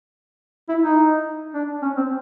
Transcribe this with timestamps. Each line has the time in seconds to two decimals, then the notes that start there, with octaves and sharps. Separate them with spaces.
0.69 E4
0.83 D#4
1.54 D4
1.82 C#4
1.97 C4